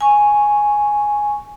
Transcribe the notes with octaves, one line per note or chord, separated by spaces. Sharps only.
G#5 C#6